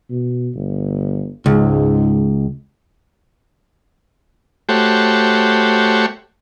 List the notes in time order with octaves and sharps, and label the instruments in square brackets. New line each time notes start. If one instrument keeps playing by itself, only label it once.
[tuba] B2
G1
[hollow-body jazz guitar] C#2 [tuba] G#2
[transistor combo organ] A3 F#4 G4 C5 C#5